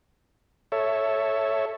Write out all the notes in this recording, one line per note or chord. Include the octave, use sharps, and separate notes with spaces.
A4 C#5 E5